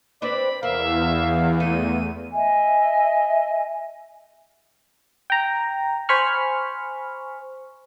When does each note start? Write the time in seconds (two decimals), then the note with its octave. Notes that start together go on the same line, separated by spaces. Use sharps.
0.22 C4 D4 B4 D5 B5
0.63 E2 A#4 E5 F5
1.60 A3 D#7
2.32 D#5 E5 G#5
5.30 G5 A#5
6.09 C5 G#5 B5 C#6 F6